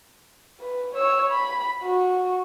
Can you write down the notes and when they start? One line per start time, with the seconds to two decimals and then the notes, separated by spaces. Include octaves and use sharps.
0.61 B4
0.95 C#5 E6
1.30 B5
1.83 F#4